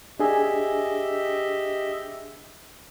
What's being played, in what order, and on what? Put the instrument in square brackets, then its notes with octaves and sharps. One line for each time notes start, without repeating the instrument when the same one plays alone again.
[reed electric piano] D4 G#4 G#5 [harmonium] G4 D#5 E5